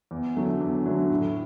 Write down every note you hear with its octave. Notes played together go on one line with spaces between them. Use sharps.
E2
D3 F#3 A3
E2
D3 F#3 A3
A2